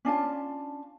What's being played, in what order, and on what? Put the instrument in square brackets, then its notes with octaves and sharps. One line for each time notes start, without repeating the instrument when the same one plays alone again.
[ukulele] C#4 D4 F4 A5